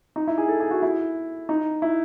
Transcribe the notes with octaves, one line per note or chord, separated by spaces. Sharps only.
D#4
E4
G#4
A4
G#4
F#4
E4
D#4
E4